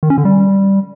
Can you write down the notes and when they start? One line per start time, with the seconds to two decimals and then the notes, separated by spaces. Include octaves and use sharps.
0.03 D#3
0.10 C#4
0.18 D3
0.25 G3